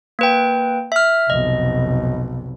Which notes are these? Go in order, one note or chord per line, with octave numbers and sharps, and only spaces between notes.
A#3 B4 G5
E5 F6
F1 B1 D#5